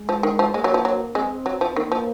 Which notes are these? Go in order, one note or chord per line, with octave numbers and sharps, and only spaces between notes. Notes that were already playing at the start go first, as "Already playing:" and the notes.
Already playing: G#3
F3
D#3
F3
G#3 A#3
F#3
F3
F#3
G#3 C4
F#3
F3
D#3 A#3
F3